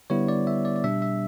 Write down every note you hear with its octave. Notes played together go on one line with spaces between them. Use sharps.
D3 G3 B3 E4 C#5
D5
E5
D5
D5
B2 G3 D4 E5
E5